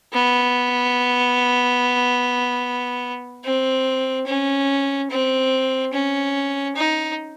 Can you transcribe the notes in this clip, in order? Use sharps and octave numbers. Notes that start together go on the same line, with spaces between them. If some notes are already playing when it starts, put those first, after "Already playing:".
B3
C4
C#4
C4
C#4
D#4